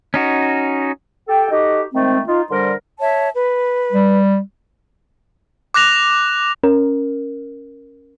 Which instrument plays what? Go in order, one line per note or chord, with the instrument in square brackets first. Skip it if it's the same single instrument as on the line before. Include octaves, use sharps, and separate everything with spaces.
[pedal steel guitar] C#4 D#4 F#4
[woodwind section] G4 A4 G5
D#4 F#4 G4 A4 D#5
D#3 G#3 A3 C4
D#4 F4
D3 G3 A#4 C5 C6
[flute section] C#5 E5 A5
B4
[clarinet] G3
[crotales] D6 F#6 A#6 F7
[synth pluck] C#4 A#4